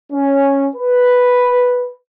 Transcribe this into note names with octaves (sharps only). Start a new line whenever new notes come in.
C#4
B4